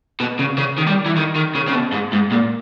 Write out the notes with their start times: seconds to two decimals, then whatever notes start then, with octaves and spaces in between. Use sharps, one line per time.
0.20 B2
0.39 C#3
0.58 C#3
0.78 D#3
0.87 G3
1.06 E3
1.16 D#3
1.35 D#3
1.55 C#3
1.67 C#3
1.73 B2
1.92 G#2
2.12 G#2
2.31 A#2